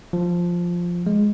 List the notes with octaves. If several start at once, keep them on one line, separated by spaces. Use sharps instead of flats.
F3
G#3